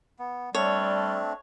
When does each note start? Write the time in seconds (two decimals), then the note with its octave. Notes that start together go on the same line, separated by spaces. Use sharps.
0.19 B3
0.55 G3 A3 C4 D4 C#5